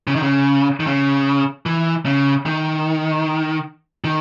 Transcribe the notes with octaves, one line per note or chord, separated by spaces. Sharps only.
C#3
D#3
C#3
D#3
C#3
E3
C#3
D#3
D#3